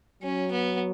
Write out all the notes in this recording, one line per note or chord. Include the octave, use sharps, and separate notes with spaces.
F#3 C#4
B3